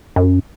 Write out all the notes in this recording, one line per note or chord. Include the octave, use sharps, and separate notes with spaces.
F#2